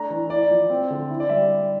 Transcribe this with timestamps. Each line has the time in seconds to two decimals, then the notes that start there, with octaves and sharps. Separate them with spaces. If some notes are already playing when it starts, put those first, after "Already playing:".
Already playing: A3 D4 A#5
0.10 E3
0.30 E4 D5
0.51 F3
0.70 C4
0.90 D3
1.10 E4
1.20 D5
1.29 G3 E5